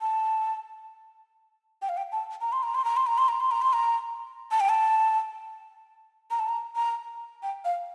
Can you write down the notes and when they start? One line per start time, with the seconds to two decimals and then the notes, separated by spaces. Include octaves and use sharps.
0.01 A5
1.82 G5
1.89 F5
1.97 G5
2.12 A5
2.41 A#5
2.52 C6
2.63 A#5
2.75 C6
2.85 A#5
2.97 C6
3.07 A#5
3.18 C6
3.28 A#5
3.40 C6
3.51 A#5
3.62 C6
3.73 A#5
4.51 A5
4.60 G5
4.69 A5
6.31 A#5
6.39 A5
6.49 A#5
6.76 A#5
7.43 G5
7.65 F5